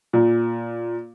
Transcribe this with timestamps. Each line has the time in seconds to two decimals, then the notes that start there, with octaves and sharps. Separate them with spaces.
0.13 A#2